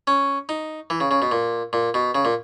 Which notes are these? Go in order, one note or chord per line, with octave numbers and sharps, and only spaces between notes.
C#4
D#4
E3
C#3
C#3
B2
A#2
A#2
B2
C#3
A#2